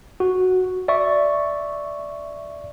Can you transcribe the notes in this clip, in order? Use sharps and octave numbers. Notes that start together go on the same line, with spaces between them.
F#4
D5 E5 C#6